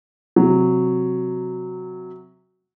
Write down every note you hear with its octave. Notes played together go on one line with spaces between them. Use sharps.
C3 F#3